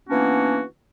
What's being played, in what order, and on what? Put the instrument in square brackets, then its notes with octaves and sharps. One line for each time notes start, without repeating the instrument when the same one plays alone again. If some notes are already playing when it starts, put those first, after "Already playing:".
[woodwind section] E3 A#3 B3 C#4 D4 F#4